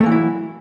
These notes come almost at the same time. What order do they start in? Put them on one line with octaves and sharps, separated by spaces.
A3 A#3 E3 F#3 E4